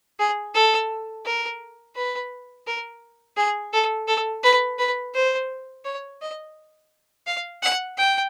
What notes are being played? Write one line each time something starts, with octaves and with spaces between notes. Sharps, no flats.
G#4
A4
A#4
B4
A#4
G#4
A4
A4
B4
B4
C5
C#5
D#5
F5
F#5
G5